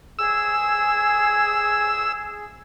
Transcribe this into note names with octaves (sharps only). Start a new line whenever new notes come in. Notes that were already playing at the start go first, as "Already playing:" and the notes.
G#4 E6